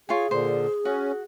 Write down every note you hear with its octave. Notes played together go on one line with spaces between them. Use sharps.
F4 G#4 C#5 G#5
A#2 D3 C5
C#4 F#4